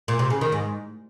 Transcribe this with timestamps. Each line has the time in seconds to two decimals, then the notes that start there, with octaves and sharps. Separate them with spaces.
0.08 A#2
0.19 C3
0.30 C#3
0.41 D#3
0.52 G#2